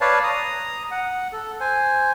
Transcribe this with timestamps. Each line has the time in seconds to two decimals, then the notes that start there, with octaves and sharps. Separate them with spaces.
0.01 B4 C#5 D5 F5 A5
0.23 A#5 D#6
0.91 F#5
1.32 A4
1.60 C5 G#5